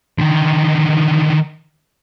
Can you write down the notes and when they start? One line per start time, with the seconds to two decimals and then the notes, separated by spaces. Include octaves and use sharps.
0.19 D3 D#3